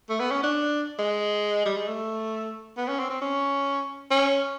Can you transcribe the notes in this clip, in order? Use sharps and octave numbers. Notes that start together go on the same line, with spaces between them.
A3
B3
C#4
D4
G#3
G3
G#3
A3
B3
C#4
C4
C4
C#4
C#4